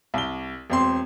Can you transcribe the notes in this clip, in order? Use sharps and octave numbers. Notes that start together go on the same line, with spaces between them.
C2 G7
E1 C4 C6